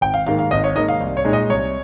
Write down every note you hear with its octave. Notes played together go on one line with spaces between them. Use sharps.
G#1 G5
F5
G#2 D#3 A#3 F5
F5
G#1 D#5
C#5
G#2 D#3 A#3 D#5
F5
C2
C#5
A#2 G#3 D#4
D#5
C2 C#5